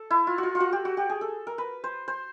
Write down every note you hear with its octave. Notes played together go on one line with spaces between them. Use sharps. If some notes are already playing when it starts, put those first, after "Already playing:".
Already playing: A4
E4
F4
F#4
F4
F4
F#4
G4
F#4
G4
G#4
A4
A#4
B4
C5
C5